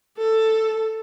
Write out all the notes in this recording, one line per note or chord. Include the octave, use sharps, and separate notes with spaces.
A4